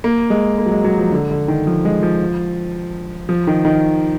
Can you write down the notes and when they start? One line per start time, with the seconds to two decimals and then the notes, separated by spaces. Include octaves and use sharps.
0.04 A#3
0.30 G#3
0.58 A#3
0.66 F#3
0.72 G#3
0.84 F#3
0.98 F3
1.12 D3
1.31 D3
1.48 D#3
1.67 F3
1.85 G#3
2.03 F3
3.29 F3
3.47 D#3
3.65 D#3